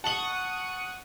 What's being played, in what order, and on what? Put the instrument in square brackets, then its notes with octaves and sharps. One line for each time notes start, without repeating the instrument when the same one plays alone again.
[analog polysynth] F#5 C#6 D#6 [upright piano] A5 F#7